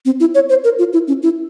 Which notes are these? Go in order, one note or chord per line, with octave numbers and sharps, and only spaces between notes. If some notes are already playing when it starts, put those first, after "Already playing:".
C4
E4
C#5
C5
A#4
F4
E4
C#4
E4